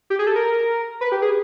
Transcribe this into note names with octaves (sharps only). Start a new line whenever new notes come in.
G4
G#4
A4
A#4
B4
G4
G#4